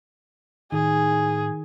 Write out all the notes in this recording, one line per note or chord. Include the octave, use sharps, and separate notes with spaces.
A2 D#3 G#4